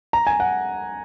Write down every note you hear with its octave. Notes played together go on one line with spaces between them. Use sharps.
A#5
G#5
F#5